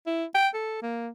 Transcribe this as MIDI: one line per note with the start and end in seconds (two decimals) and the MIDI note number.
0.06 0.25 64
0.35 0.48 79
0.54 0.77 69
0.82 1.09 58